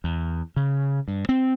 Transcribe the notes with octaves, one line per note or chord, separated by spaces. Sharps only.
E2
C#3
G2
C4